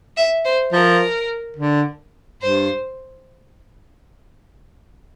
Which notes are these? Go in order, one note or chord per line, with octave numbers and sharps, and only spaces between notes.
E5
C5
F3 A#4
D3
G2 C5